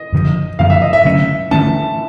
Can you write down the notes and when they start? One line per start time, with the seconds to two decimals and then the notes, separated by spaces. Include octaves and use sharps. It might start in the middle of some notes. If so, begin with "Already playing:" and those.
Already playing: D#5
0.13 F#2 D3 F3
0.59 F#2 D3 F3 F5
0.70 E5
0.82 D#5
0.93 E5
1.05 D3 F#3 A3 C#4
1.51 D3 F#3 A3 C#4 A5